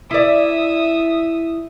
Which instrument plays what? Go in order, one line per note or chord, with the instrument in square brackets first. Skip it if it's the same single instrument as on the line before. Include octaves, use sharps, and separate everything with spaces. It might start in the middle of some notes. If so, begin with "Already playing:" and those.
[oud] E4 D5 [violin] E5 D#6